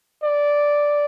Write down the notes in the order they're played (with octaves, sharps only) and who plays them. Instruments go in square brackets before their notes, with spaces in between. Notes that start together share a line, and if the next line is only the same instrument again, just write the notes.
[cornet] D5